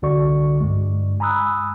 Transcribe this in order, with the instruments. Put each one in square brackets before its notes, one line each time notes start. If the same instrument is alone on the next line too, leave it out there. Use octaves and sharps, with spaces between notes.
[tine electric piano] C2 D3 F#4 D5 C#6
G2 G#3
G#5 A#5 B5 D#6 E6 F#6